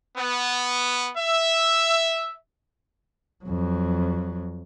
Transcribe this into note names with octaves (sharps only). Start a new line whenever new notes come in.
B3
E5
F2 F#3